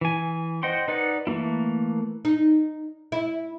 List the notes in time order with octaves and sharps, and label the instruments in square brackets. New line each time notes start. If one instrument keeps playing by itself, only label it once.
[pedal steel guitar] E3 G#5
C5 D#5 F#5 G5 C6
D#4 B4 D5 F#5
E3 A3 A#3 E4
[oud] D#4
E4